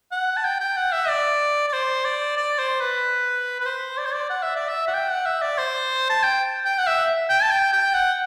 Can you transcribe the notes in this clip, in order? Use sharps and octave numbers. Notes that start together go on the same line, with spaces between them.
F#5
A5
G5
G5
F#5
E5
D5
D5
C5
D5
D5
C5
B4
B4
C5
D5
C5
D5
F#5
E5
D5
E5
F#5
G5
F#5
E5
D5
C5
A5
G5
G5
F#5
E5
G5
A5
G5
G5
F#5